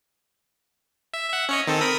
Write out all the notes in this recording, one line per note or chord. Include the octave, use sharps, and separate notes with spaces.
E5
E5 F#5
C#4 C#5 D#5
D#3 C4 A4
A#4 B5 D#6